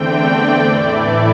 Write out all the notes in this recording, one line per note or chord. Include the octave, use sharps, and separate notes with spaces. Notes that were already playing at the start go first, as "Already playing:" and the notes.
Already playing: E2 D3 A3 C4 G5
D5
A2 E3 A3 E4 D5